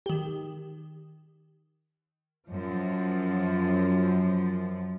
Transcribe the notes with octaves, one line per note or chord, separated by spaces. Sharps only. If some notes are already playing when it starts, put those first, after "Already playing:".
D#3 G4
F#2 F3